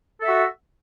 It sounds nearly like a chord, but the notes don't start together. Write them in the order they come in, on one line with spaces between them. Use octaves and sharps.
A4 E5 F#4